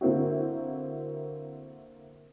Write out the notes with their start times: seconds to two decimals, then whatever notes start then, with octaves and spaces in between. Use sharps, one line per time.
0.01 D3 A#3 C4 E4 F#4